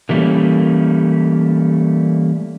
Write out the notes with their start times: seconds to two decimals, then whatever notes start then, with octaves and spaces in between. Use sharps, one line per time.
0.09 D3 E3 G3 A3 A#3 C#4